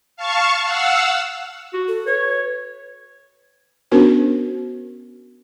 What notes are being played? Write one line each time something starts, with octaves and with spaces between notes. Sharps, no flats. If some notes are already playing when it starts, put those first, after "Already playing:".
F5 A5 C#6
F5 F#5 E6
F#4
A4
B4 C#5
B3 C#4 D4 F#4 A#4 C5